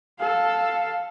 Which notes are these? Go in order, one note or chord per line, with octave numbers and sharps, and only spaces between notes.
A4 F5